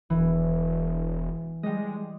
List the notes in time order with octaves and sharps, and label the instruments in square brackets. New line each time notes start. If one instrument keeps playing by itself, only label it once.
[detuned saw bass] E1 [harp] E3
[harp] G3 D#5 [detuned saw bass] G#3